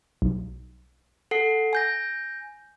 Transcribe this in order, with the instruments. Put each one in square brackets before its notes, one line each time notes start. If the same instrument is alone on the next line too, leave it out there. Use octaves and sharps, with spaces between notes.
[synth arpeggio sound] B1
[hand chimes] A4 F#5 C7
G#5 G6 A#6